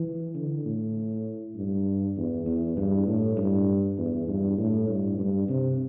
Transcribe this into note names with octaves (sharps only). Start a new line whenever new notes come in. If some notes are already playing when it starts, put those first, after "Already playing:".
Already playing: E3
D3
A2
G2
E2
E2
G2
A2
G2
E2
G2
A2
G2
G2
C3